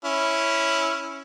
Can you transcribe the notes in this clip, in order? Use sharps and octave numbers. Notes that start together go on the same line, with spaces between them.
C#4 E4